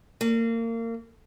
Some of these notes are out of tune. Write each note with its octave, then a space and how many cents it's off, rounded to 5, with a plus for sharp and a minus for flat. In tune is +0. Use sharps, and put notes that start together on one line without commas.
A#3 -30